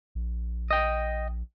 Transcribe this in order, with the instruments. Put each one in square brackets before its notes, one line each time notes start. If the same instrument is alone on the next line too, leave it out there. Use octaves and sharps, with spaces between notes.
[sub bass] A#1
[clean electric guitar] D#5 G5